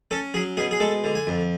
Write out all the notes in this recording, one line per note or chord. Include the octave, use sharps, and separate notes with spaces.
C#4 A4
F#3 G#4
B2 G#4
G#4
G#3 A4
D3
G#5
F2